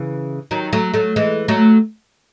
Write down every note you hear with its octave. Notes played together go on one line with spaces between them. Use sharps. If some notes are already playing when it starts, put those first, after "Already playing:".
Already playing: C#3 E3
D#3 F#3
F#3 A3
F#3 A3
E3 G#3
F#3 A3